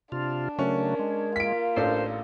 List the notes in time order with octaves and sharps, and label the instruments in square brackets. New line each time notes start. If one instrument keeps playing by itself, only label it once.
[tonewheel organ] C3 F4 [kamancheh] D4
[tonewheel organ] C#3 F#3 A3 [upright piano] C#4 [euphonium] A#4
[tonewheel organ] G#3
[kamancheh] A#3 F4 [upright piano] B6 D7
[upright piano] A1 D4 A4 [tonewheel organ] C5